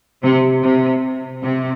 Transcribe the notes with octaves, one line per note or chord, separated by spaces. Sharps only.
C3
C3
C3